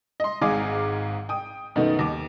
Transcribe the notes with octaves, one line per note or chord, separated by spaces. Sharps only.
D#5 C6
G#1 G#2 G#4 F5 D6 D#6
G5 D#6
F#2 B2 D#3 A3 B3 D#4
D#2 D6